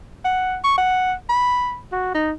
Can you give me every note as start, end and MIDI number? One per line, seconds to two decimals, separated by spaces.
0.25 0.57 78
0.64 0.75 85
0.78 1.13 78
1.29 1.77 83
1.92 2.10 66
2.15 2.32 63